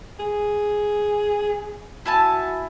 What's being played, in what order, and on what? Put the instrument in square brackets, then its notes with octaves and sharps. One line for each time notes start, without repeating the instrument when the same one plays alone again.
[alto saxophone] G#4
[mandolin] E4 G#5 A5 [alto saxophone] F#4